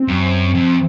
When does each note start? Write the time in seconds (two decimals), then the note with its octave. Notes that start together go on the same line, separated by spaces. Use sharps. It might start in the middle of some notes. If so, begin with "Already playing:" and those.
Already playing: C4
0.08 F#2
0.55 F2